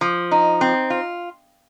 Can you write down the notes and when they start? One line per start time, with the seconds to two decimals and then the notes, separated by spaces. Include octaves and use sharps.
0.01 F3
0.31 D#4
0.61 C4
0.90 F4